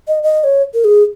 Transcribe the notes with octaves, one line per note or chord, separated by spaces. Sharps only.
D#5
D#5
C#5
A#4
G#4